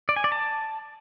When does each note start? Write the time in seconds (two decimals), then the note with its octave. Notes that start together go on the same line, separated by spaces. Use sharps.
0.09 D5
0.16 G#5
0.24 D5
0.32 A5